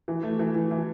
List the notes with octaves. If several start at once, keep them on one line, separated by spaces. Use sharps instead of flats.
E3
A3
E3
E3
E3